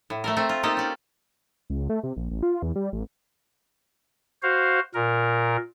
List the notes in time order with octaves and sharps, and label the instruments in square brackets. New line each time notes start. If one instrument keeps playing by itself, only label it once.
[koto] A2
A3 A4 A#4
A3 C4 A#5
F4
A#3 D#4 G4 A4 D#5
C#4 D5
[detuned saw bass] C#2
A3
C3
A#1
A1
F4
E2
G3
A1
[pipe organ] F#4 C5 F5
A#2 A#4